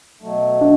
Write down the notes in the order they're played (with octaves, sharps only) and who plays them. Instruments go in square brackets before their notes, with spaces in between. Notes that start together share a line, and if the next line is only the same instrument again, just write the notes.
[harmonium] B2 F#3 A3
[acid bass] D4